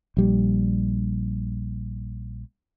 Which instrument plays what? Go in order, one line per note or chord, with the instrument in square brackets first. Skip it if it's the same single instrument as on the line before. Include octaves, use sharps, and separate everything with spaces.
[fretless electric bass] A#1 G3